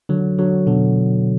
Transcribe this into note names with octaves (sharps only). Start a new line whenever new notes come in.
D3 F#3
D3 F#3
B2 D3